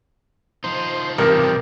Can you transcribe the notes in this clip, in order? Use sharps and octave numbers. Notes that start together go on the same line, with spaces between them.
F3 D#4 C5
A1 G2 C3 G3 A#4